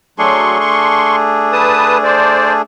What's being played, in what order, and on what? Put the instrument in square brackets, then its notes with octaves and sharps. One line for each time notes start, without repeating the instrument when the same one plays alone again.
[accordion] F#3 C6 C#6 [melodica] A3 D4 G#4
[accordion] C6 C#6
B4 A5 D#6
C5 D5